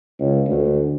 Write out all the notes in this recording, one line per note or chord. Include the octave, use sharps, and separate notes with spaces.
C#2
D2